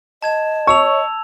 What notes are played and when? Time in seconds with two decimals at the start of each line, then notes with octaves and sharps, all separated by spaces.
0.22 D#5 A5 G#6 E7
0.67 C#5 A5 C#6 E6 F7